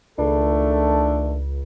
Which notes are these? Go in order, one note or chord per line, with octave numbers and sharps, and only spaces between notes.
C#2 D#3 A3 D4 A4